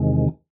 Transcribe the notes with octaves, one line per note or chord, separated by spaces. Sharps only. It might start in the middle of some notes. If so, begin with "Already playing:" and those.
Already playing: E2 C3 D#3 G#3